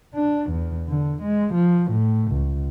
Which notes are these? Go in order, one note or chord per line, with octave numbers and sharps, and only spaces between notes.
D4
E2
D3
G#3
F3
A2
C#2